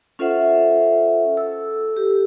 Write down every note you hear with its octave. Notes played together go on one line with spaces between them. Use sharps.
C#4 F4 A4 C5 E5 F#5
A4 E6
G4